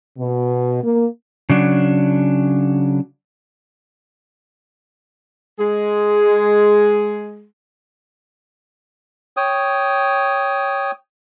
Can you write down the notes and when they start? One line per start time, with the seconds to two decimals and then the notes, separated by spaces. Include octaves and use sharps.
0.19 B2
0.84 A#3
1.50 C#3 F#3 D4
5.59 G#3 G#4
9.37 C#5 G5 D#6